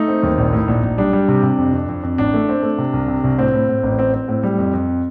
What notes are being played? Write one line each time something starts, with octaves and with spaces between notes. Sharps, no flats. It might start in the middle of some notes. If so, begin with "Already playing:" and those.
Already playing: A3 D#4
C4
D#2
A#1
A2
A#1
A#1
G3 D4
G3
C3
C3
F2
F2
F2
F2
A1 D4
A3
C4
A3
C3
C2
C3
C2
A2 C4
A2
A2
A1
C4
C4
A2
G3
F2
F2